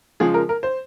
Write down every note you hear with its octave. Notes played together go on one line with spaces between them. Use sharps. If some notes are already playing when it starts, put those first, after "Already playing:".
C#3 F3 G#3 G#4
A#4
A#4
C5